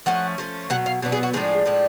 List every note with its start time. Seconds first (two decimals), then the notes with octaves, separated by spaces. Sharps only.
0.06 F3 A3 C#4 F#5
0.38 F3 A3 C#4
0.70 B2 F#3 F#5
0.86 F5
1.02 B2 F#3 B3 D4
1.12 G#4
1.23 F#4
1.33 A2 F3 G#3 D4 G#4
1.66 A2 F3 G#3 D4